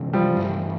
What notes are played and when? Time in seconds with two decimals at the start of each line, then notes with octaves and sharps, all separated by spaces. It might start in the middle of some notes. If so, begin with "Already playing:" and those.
Already playing: C3 E3 G#3 C#4 F#4
0.13 F3 G3
0.36 G2 E3 A3